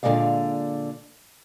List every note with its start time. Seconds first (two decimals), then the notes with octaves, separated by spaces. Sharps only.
0.03 A#2 D3 D#3 G#3 D5 F5